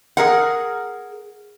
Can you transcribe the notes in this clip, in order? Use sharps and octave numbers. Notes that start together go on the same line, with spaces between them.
G#4 A#4 F#5